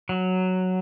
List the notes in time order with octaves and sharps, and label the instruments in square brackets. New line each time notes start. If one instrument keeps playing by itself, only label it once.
[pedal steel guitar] F#3